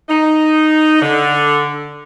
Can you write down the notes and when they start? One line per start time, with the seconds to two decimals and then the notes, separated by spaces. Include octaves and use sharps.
0.09 D#4
1.02 D3